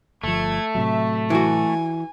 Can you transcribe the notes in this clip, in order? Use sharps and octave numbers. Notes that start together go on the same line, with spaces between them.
G1 F3 A3 G#6
A2 C3 F#3 E5
E3 F#4 G#5